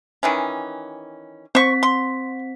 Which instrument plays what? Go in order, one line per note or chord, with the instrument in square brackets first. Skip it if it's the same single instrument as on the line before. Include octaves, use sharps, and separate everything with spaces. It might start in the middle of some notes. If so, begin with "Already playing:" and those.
[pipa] D#3 E3 C#4
[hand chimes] C4 B6 [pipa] C5 C#6
[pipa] C6